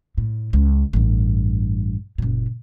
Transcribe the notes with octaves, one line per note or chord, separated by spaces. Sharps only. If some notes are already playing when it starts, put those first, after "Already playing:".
A2
C#2
A1 G2
F#1 A#2